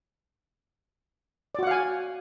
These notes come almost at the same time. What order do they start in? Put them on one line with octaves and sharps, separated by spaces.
D5 F#4 F#5 F5 G#5